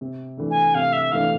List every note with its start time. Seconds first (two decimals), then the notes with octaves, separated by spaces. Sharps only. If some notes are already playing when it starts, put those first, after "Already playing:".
0.01 C3
0.37 E3 A3 D4
0.51 G#5
0.75 C3 F5
0.93 E5
1.12 E3 A3 D4 F5